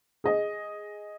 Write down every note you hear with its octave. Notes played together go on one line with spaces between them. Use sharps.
G#4 D#5